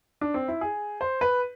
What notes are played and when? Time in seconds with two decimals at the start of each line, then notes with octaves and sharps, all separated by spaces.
0.21 D4
0.34 C4
0.48 E4
0.61 G#4
1.01 C5
1.21 B4